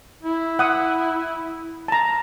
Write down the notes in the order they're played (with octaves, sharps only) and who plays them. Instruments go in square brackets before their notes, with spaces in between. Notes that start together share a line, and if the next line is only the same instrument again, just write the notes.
[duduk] E4
[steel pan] F#5 D#6
A5 A#5